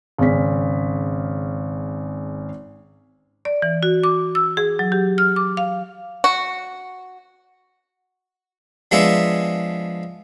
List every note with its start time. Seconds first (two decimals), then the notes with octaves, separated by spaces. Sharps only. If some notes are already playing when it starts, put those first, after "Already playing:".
0.18 G#1 C#3 C#4 B6
3.45 D5
3.62 E3
3.83 F#4
4.04 D6
4.35 E6
4.57 G#4
4.79 F#3
4.92 G4
5.18 F6
5.36 D6
5.57 F5
6.24 F#4
8.91 F3 G#3 B3 D4 G#4 E5